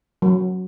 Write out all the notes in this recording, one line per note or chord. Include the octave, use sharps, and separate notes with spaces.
F#3